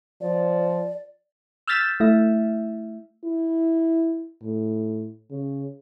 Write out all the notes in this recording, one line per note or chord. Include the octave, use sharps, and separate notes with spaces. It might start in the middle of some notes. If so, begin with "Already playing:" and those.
F3 D5
E6 F6 G6 A6 B6 E7
A3 E4 E5
E4
A2
C#3